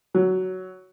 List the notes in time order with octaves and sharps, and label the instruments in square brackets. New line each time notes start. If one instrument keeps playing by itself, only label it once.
[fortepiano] F#3